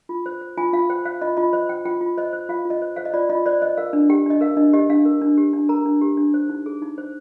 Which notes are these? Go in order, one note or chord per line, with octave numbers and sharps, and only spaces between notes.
F4
C5
C5
F4 G#5
F4 F5
C5 G5
C5 F5
F4 D#5
F4 D#5
C5 D#5
C5 G5
F4 G5
F4
C5 D#5
C5
F4 F5
F4
D#5
C5
C5 F5
D#5
F4 D5
F4 D#5
C5 D5
C5 D#5
A#4 F5
D4
G4 G5
D4 D#5
A#4 F5
D4 D#5
G4 D#5
D4 F5
A#4
D4
G4
D4
A#4 A#5
D4
G4
D4
C5
D#4
G#4
D#4
C5